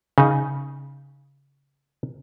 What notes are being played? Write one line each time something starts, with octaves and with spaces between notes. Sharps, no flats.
C#3 D#4